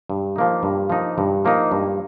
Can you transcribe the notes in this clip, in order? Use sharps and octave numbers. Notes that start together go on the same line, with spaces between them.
G2
F3 A#3 D#4
G2
F3 A#3 D#4
G2
F3 A#3 D#4
G2